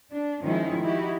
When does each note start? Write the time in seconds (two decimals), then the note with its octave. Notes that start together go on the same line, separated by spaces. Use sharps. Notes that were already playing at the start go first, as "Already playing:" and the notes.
0.11 D4
0.42 D#3 F3 G#3 C#4 D#4 E4
0.83 D#4 E4 F#4 G4